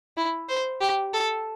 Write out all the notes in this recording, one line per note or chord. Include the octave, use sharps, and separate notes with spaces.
E4
C5
G4
A4